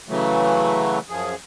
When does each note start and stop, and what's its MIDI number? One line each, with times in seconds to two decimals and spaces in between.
0.09 0.99 49
0.09 0.99 52
0.09 0.99 54
0.09 0.99 57
1.10 1.35 42
1.10 1.35 53
1.10 1.35 68